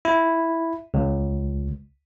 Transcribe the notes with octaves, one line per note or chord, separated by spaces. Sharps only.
E4
C#2